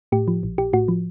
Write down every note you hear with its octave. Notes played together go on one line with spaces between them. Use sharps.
A2 G4
F3
A#1
A#1 G4
A2 F#4
F3